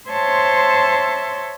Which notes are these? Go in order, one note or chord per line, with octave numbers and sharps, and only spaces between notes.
C5 C#5 E5 A5 C6